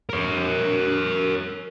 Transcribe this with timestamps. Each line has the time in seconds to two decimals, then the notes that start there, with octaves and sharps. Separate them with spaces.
0.10 A#4 C#5